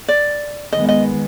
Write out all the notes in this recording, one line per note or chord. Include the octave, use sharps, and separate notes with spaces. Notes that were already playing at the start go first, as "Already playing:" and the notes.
D5
D#3 G#3 B3 D#5
D#5